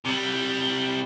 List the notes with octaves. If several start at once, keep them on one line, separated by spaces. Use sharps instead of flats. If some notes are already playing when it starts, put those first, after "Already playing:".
C3 G3